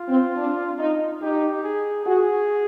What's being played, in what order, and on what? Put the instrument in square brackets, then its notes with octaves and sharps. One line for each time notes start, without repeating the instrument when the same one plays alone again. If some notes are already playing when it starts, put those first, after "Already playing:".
Already playing: [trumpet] F4
[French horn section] C4
D4
D#4
[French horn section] D#4 [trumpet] G4
[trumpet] G#4
[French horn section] F#4 [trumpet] G#4